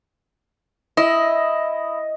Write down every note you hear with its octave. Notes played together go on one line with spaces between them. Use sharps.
E4 D#5